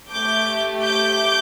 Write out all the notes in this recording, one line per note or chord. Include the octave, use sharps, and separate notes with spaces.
A3 G4 D6 G6
D6 G6